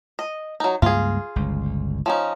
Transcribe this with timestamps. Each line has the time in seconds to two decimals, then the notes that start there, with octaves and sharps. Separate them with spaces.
0.19 D#5
0.60 F#3 D#4
0.82 C#2 G2 A#3 F4 G#4
1.36 G1 C#2
2.06 F3 C#4 D#4